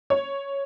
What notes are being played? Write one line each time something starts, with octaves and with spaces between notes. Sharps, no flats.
C#5